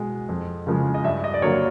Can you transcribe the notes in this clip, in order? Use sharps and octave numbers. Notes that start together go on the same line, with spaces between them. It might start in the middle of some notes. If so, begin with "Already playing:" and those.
Already playing: B2 G#3
F2
C#3 F3 G#3
D#5
G2 E5
D#5
D5
D3 F#3 A#3 C#5